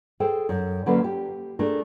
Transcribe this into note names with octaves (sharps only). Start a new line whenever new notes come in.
G#4 A4 C5 G5
F#2
D3 F#3 A#3 C#4 B4
G4
A3 D4 G#4 A#4